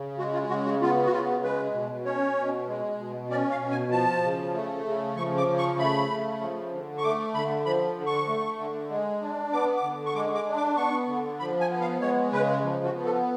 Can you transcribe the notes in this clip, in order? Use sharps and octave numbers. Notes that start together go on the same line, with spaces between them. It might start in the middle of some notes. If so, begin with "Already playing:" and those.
Already playing: C#3
G#3 F#4
F4
C#3 F#4
F#4
B3 F4
F#4
C#3 F4
G#3 B4
B2
C#4 C#5
B2
G#3
B2
C#4 D5
F5
B2
G#5
F3 A5
C#3
A3
C#3
F3 C#6
D6
C#3
C#6
A3 B5
C#3
F3
D3
C#6
A3 D6
D3 B5
F3 B5
D3
C#6
A3
D3
G#3
D4
B3 D6
D6
D3
C#6
G#3 D6
D6
D4
D6
B3 C#6
D3
F3 B5
G#5
B3
F5
G#3 C#5
C#3 B4
F3
F#4
B3
A4